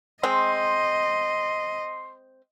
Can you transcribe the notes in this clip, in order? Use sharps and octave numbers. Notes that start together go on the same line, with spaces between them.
G#3 C4 D#5 C6